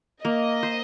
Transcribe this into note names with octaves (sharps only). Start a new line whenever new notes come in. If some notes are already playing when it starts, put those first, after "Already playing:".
A#3 D#5
C5